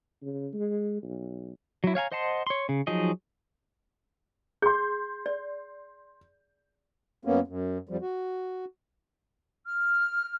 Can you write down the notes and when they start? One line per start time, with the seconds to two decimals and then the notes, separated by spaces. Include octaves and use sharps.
0.22 C#3
0.53 G#3
1.02 B1
1.84 F#3 E4
1.95 C#5 F5 G#5 A#5
2.12 C5 D#5 F#5 A5 C6
2.47 C#5 C6
2.69 C#3
2.87 F3 F#3 D#4 G#4 D#5
4.62 G#4 C6 G6
5.26 D5
7.25 F#2 A#3 B3 C#4
7.47 F#2
7.89 F2 F3 G3
8.02 F#4
9.66 F6